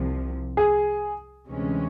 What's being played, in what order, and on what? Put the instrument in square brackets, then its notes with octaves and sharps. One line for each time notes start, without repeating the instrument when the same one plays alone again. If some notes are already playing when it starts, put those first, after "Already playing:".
Already playing: [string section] C2 C3 F3
[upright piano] G#4
[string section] D2 C3 E3 G#3 C#4